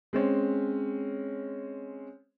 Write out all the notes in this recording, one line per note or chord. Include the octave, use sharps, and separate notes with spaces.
G#3 C4 C#4